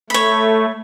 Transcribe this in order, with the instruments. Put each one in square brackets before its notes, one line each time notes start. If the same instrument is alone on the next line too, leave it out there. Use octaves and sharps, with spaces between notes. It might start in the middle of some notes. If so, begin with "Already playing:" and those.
[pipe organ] A3 [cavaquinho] C#5 B5